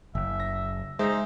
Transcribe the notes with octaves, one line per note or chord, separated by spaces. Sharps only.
F#1 E5
A#6
G#3 D#4 C5 E5